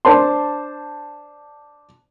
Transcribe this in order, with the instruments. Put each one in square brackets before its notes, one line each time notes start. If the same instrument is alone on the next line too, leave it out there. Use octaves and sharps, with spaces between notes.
[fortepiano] D4 C5 A5 C6